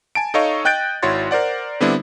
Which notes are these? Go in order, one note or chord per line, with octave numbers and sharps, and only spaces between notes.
G#5 A5 D7
D#4 A4 C#5 D#5 F5 C#6
D#5 G5 F#6 G6 A6 D7
G#1 E4 F#4 C#5 C6 A6
A#4 C5 D5 F#5
D3 G3 B3 C4 D4 E4